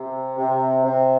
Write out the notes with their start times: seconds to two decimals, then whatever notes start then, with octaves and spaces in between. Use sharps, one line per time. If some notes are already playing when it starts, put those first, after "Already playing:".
Already playing: C3
0.37 C3
0.84 C3